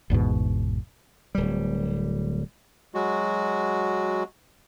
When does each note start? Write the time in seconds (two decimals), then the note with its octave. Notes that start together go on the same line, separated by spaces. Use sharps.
0.10 G#1 E2 G#2 B2
1.35 D1 G3
2.94 F#3 G#3 F#4